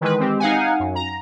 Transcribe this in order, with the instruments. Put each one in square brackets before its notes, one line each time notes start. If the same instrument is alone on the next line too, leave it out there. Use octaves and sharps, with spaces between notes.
[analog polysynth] D#3 E3 G#3 B4
G#3 C4 G4
D#4 F5 F#5 G#5
F#2
A#5